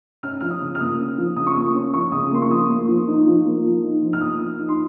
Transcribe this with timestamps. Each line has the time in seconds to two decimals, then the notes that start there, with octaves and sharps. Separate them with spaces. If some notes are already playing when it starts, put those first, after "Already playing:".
0.23 C#4 F6
0.41 F3 F6
0.51 D#6
0.61 C#3
0.75 F6
0.80 A#3 D#6
0.99 C#4
1.18 F3
1.36 C#3 D#6
1.47 C#6
1.55 A#3 D#6
1.74 C#4
1.94 F3 C#6
2.12 C#3 D#6
2.31 A#3 C6
2.42 C#6
2.50 F3 D#6
2.69 A#3
2.88 F3
3.08 D#4
3.27 F3
3.46 A#3
3.65 F3
3.83 D#4
4.03 F3
4.13 F6
4.21 A#3 D#6
4.40 F3
4.59 D#4
4.69 C6